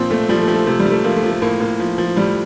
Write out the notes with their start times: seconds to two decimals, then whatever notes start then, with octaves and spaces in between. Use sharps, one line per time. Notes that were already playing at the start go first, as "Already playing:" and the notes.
Already playing: A#2 F3 C4
0.10 A#2 A3
0.29 F3 G3
0.42 A3
0.48 F3
0.54 A3
0.67 C3 A3
0.80 G3
0.86 C3
0.92 A3
1.04 F3 A#3
1.16 A3
1.23 F3
1.29 A3
1.42 A2 A#3
1.60 A2 A#3
1.79 F3
1.98 F3
2.17 A2 G3